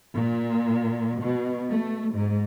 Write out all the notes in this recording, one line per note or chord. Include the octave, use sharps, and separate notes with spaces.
A#2
B2
A3
G#2